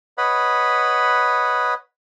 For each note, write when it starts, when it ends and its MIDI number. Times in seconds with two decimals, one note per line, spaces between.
0.18 1.74 71
0.18 1.74 73
0.18 1.74 75
0.18 1.74 78
0.18 1.74 83